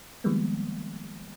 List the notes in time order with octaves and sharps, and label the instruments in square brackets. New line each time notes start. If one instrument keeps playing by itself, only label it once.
[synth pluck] D#3 F3 G3 G#3 A#3 B3